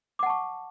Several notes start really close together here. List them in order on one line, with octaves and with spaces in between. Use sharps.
D6 F#5 A5 C#6